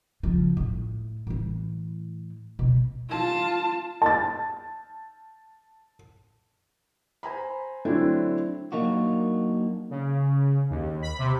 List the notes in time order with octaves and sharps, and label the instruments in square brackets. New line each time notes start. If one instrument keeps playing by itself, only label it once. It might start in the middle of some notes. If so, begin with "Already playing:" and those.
[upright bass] C#3 F3
A2
A2 E3
B2
[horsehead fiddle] F4 A5
[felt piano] A5 A6
C5 G#5 A#5 B5
D3 F#3 A3 C4 D4 E4
[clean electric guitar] F#3 A#3 D4 D#4 F#4
[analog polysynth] C#3
D#2
B5
C3